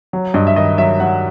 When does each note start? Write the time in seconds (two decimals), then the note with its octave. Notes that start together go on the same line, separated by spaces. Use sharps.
0.13 F#3
0.34 G2 D#5
0.47 E5
0.56 D#3 D#5
0.78 F#3 E5
1.00 F#3 F#5